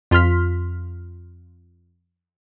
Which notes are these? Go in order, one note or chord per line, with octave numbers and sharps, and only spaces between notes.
F2 F4 C6 F6 B6